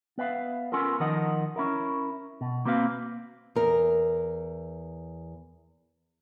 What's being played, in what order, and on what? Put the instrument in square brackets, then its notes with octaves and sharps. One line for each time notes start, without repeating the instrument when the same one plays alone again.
[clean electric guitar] B3 B4 E5 F5
B3 C#4 F4 A4 A#4
D#3 F3 D#4 A#4 D#5 F#5
C#4 E4 A#4
B2
A#3 C4 F#4 B4 C#5 F5
[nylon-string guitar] E2 A#4